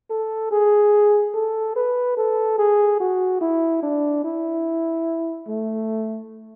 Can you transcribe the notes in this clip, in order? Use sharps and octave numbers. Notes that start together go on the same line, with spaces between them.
A4
G#4
A4
B4
A4
G#4
F#4
E4
D4
E4
A3